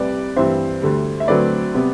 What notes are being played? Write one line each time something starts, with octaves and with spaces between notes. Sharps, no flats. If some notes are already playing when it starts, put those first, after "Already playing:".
Already playing: C2 C3 G3 B4 D5
G2 E3 G3 C4 C5 E5
D2 D3 G3
E5
D2 D3 F#3 A3 C4 B4 D5
C3 G3 B3